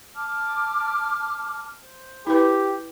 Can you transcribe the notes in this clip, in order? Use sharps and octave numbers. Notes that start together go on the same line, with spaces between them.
A5 D6 F6
C5
E4 G4 B4